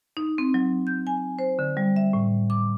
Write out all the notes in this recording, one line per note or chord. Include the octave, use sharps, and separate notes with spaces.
D#4
C4
F#3
G6
G#5
C5
D3
G3
E5
A2
D6